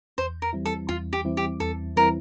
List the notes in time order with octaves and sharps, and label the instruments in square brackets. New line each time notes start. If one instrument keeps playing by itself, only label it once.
[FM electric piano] E2 [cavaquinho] C5
[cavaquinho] A#4
[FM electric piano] E3 G3 C4 E4
[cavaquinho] A4
[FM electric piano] E2 [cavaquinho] F4
[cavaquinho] G4
[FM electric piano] E3 G3 C4 E4
[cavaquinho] G4
[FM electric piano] E2 [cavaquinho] A4
[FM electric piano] E3 G3 C4 E4 [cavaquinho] A#4